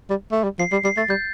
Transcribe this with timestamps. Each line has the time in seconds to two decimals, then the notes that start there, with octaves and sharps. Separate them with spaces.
0.10 G3
0.32 A3
0.43 G3
0.59 F3 C7
0.72 G3 C7
0.84 G3 C7
0.97 A3 A6
1.09 G3 G6